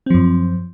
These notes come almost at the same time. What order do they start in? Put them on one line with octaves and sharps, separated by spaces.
C4 F3 F#2